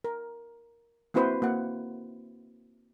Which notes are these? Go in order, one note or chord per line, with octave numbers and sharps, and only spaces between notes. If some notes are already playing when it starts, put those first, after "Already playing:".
A#4
A#3 C4 E4 F#4 B4 C5
A#3 F#4 F#5